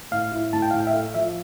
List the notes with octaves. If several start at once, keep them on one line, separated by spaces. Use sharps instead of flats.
A2 F5
E4
A2 A5
G5
A2 F5
G5
E5
A3 F5
F3 E5